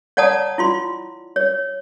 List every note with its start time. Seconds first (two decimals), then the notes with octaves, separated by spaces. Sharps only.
0.17 C#5 D5 F#5 A5 A#5 D#6
0.58 E4 F4 C6
1.36 C#5